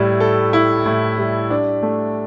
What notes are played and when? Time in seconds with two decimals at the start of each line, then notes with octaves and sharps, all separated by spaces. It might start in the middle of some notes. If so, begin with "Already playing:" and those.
Already playing: A2 G3 E4
0.20 A4
0.53 E4
0.86 A2
1.18 G3
1.50 D4
1.83 A3